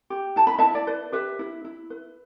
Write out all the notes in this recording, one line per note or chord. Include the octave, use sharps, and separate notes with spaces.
G4
E4 A5
B5
E5 A5
E4
D5
B4
G4 B4 E5
E4
E4
B4